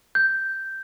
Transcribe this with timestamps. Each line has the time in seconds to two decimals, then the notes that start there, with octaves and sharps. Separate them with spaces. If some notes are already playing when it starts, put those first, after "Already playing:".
0.15 G6